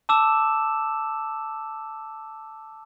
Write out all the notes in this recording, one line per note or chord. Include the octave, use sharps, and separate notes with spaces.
A5 D6 E6 E7